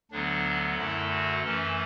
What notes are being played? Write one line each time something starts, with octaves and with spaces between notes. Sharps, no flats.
D2 D3 F#3 B3 D4
F#2 D3 A3 E4
F#4
F#2 E3 A3 C#4